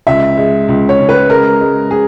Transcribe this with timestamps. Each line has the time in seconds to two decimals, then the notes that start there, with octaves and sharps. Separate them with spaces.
0.07 C#2 E5
0.37 G#3
0.68 C#2
0.89 C#5
0.99 C#3
1.09 B4
1.30 G#3 A#4
1.60 G#3
1.91 G#4